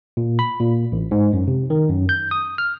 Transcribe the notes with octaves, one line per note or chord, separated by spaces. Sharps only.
A#2
B5
A#2
A1
G#2
F#2
C3
D#3
F#2
G6
D#6
F6